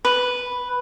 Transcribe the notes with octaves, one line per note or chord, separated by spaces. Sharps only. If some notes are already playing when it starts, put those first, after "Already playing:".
B4